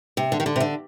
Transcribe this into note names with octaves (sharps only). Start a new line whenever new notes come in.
C3
D3
D#3
D3
C3
D3